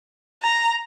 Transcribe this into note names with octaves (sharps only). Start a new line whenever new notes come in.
A#5